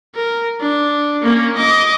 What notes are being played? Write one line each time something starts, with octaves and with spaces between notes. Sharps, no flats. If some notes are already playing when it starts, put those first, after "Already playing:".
A#4
D4
A#3 C#4
D#5 D6